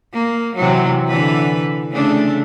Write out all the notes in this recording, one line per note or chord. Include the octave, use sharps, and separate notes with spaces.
A#3
C3 E3 F#3
D3 E3 B4
C#3 A3 D4